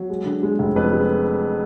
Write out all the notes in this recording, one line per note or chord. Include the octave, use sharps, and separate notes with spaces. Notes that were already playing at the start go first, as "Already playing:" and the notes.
Already playing: F#3
G#3
D3
G#3
F1
F2 B4
G#3